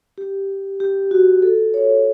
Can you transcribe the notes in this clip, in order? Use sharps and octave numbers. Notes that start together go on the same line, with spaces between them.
G4
G4
F#4
A4
C#5